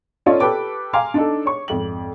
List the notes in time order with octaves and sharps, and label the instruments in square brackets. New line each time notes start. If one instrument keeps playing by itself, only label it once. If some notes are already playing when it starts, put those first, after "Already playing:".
[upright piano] C#4 F4 A4 D5 D#5
G4 A4 B4 G5 D6
F5 G#5 A#5 C6 D6
D4 D#4 A4
C#5 C#6
G#1 F2 F#7